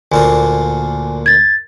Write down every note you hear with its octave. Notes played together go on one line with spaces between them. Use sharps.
D2 A#2 A#3 G#5
G#6 A6